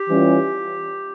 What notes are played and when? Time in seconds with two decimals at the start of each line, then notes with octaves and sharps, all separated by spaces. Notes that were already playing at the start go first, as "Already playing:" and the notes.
Already playing: G4
0.08 E3 G3 C#4 F4